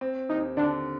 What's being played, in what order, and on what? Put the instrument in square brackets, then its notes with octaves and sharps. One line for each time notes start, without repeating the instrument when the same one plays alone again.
[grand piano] C4
[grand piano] D#2 [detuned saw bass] D#4
[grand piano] D3 [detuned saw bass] D4